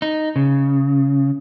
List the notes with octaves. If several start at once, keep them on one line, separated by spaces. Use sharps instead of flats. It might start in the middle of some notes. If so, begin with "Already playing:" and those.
D#4
C#3